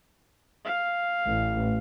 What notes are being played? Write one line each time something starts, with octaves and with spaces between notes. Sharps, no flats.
F5
A1